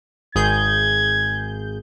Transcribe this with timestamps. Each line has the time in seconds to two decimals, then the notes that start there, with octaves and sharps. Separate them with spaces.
0.35 G#1 G#4 G6 G#6